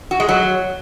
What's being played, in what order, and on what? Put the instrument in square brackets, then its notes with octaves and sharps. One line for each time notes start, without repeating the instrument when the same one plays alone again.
[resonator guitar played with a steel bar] F#4
G#3
F#3